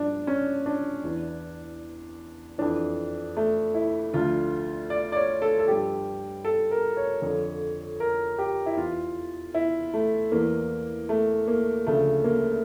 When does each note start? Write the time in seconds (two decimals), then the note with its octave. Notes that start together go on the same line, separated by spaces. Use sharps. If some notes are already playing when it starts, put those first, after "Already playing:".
Already playing: G2 F3 D4
0.27 C#4
0.66 D4
1.04 E2 E3
2.58 F2 E3 D4
3.37 A3
3.74 E4
4.14 D2 D3 F3 F4
4.90 D5
5.12 D5
5.16 C#5
5.42 A4
5.59 A4
5.68 G2 F3 G4
6.45 A4
6.71 A#4
6.97 C#5
7.22 F2 D3 F3
8.00 A#4
8.38 G4
8.66 E4
8.77 E2 E3 F4
9.55 E4
9.94 A3
10.32 E2 E3 A#3
11.09 A3
11.48 A#3
11.86 D2 C#3 F3 A3
12.24 A#3